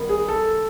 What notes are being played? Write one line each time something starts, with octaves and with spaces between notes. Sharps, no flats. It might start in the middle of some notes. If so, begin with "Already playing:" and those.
Already playing: D#3 G3 B3 F#4
G#4
A4